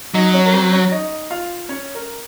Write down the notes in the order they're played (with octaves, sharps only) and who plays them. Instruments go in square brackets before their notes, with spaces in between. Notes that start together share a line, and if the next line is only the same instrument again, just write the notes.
[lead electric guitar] F#3 [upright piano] D#4 D#5
[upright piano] C#4 C#5
A#4
C4 C5
C#4 C#5
D#4 D#5
F4 F5
C#4 C#5
A#4